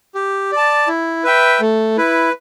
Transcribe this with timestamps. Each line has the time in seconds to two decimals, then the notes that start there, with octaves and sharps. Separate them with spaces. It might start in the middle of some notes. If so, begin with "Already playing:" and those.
0.15 G4
0.52 D5 A5
0.88 E4
1.24 B4 E5 G5
1.61 A3
1.97 E4 B4